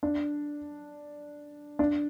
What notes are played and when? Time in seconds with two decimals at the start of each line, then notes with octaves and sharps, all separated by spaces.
0.03 D4
1.79 D4